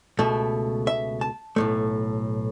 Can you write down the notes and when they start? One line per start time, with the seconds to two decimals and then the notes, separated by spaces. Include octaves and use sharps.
0.19 C#2 B2 A3
0.87 E5
1.21 A5
1.56 B1 A2 A3